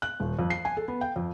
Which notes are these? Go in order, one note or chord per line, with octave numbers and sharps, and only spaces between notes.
F#6
D#1
F2
C7
G#5
A4
B3
G5
F2